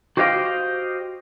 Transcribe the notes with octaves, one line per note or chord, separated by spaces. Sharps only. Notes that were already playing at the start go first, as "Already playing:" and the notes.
F#4 G4 C5 D#5 F5 G5